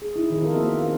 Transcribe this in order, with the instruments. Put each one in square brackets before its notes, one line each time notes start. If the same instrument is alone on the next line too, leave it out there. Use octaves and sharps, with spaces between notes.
[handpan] G#4
D#4 E4
D#3 F3 G#4
C4 E4 F4 A4 A#4
A#3 B3 F#4 A#4 D#5 E5
C4 F5 F#5